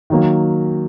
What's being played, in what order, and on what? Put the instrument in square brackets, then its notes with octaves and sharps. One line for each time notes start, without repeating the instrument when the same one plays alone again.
[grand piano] D#3 F#3 A#3